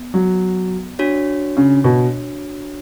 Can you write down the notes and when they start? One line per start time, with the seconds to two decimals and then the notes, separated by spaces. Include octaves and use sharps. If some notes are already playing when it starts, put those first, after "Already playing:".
Already playing: B3
0.14 F#3
0.99 D4 F#4 C#5
1.57 C#3
1.84 B2